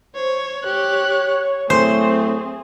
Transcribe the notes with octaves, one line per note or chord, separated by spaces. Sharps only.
C5 C#5
G4 C#5 F#6
A2 F#3 A3 C4 G#4 C5